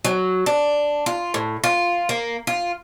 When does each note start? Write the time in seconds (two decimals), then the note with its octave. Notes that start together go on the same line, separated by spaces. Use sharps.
0.05 F#3
0.46 D4
1.06 F4
1.34 A2
1.64 F4
2.09 A#3
2.47 F4